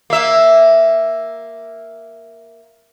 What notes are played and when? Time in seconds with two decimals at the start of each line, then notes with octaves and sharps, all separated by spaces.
0.10 A#3 E5